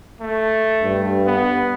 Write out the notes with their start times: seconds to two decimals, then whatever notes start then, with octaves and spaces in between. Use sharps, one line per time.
0.21 A3
0.82 G2
1.26 B3